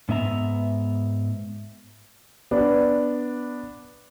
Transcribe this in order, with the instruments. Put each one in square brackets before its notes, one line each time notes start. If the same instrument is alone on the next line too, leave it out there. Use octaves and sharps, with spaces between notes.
[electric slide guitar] G#2 B3 E5 A#5
[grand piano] B3 D4